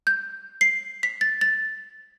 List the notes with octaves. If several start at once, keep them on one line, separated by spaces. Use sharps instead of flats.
G6
C7
B6
A6
A6